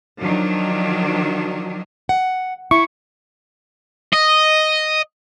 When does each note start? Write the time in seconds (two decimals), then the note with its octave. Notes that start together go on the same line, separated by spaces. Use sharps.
0.20 D#3 F3 F#3 D4
2.09 F#5
2.71 E4 C#6
4.13 D#5